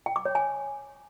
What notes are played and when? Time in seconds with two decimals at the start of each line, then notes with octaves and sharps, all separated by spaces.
0.06 G5
0.16 D6
0.25 C#5
0.35 G#5